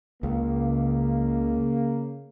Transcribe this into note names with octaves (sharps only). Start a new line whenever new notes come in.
C#2 C#3 A#3